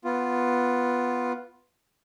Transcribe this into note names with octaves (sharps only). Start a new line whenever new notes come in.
B3 F4